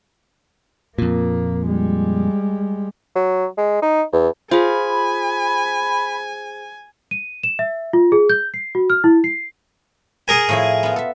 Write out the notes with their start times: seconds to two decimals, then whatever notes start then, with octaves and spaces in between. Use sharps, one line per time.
0.98 F2 A#2 A#3
1.67 G3 G#3
3.16 F#3
3.57 G#3
3.82 D#4
4.13 E2
4.51 F4 G#4 C5 G#5 B5
7.11 D#7
7.43 E7
7.59 E5
7.93 F4
8.12 G#4
8.30 G6
8.54 C7
8.75 F#4
8.90 F6
9.04 E4
9.24 C7
10.28 G#4 A#4 G#5
10.49 A2 F3 E4
10.83 B3 F4
10.96 A4 E5